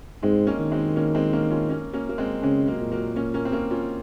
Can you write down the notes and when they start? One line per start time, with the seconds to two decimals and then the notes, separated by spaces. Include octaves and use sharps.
0.23 G#2 G#3 C4
0.47 A#3 C#4
0.60 D#3
0.72 G#3 C4
0.96 A#3 C#4
1.15 G#3 C4
1.33 A#3 C#4
1.51 C#4 F4
1.69 A#3 C#4
1.93 A#3 C#4
2.09 A#3
2.18 G#3 C4
2.43 C#3 G#3 C4
2.67 F#3 A#3
2.80 A#2
2.92 F#3 A#3
3.16 A#3 C#4
3.34 A#3 C#4
3.45 C4
3.52 A#3 C#4
3.71 C#4 F4